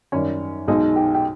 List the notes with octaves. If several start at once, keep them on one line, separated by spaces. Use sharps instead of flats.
F#2 D#3 G3 C#4
B1 B2 G#3 D#4
G4
G4